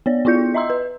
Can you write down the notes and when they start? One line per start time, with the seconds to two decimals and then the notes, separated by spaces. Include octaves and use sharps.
0.06 B3 C#5 D5
0.25 B3 E4 F4 D5 G6 C#7
0.54 D#5 E5 A#5 C6 E6
0.70 B4